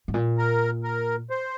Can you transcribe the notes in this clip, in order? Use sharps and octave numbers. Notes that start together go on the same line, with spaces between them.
G#2
A#2
A#4
A#4
C5